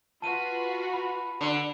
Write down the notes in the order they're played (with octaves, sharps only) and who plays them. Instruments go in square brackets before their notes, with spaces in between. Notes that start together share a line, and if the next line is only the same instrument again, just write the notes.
[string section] F4 F#4 B4 [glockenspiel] A5 D#7
[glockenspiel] B5
[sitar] D3